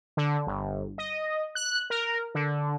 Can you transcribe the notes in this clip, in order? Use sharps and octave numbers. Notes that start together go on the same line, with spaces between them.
D3
G1
D#5
F#6
A#4
D3